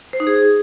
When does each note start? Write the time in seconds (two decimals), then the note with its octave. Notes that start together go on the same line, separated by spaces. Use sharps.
0.13 C5
0.20 D#4
0.27 G#4